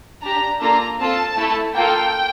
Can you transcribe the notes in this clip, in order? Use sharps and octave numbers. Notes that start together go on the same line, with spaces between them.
D4 G4 A#5
A#3 D4 F4 A4 A#5
C4 F4 A4 A5
A3 E4 A4
A#3 F4 A4 G5